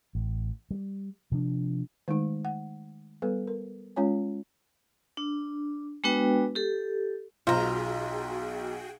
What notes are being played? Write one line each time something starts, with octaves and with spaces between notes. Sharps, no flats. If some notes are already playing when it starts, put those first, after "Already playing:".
A1
G3
C3 F3 D4
D#3 G#3 A3 D#4
F#5
G3 B3 A4 B4
A#4
G#3 C#4 F4 C#5 G#5
D4
G#3 B3 D4 F#4 B4 G5
G4 A4
B1 F4 F#4 G#4 C5 G5 A#5